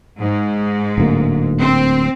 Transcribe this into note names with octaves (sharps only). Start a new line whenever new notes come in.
G#2
D1 D2 A#3
C4